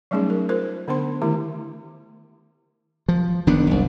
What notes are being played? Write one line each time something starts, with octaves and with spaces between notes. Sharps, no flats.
F#3 G3 A3 C#4 D#4 G#4
A#4
F4 A#4 C5
D3 B3 D4 C5 C6
D#3 A3 E4 G4
F3
F#1 D#3 B3 D4
F#1 C2